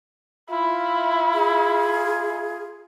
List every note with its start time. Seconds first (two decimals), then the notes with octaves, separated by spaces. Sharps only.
0.51 E4 F4
1.34 G#4